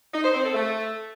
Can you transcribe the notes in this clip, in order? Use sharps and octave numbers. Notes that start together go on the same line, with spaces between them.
D#4
C5
C4
A4
A3